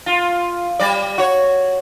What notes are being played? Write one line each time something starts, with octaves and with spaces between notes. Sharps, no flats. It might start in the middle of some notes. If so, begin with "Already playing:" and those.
F4
G3 D5
F#4 C#5